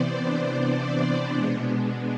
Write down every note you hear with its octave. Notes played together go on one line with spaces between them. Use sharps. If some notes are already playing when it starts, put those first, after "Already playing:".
Already playing: C3 E3 B3 C5 D5
D4
B2 G#3 B3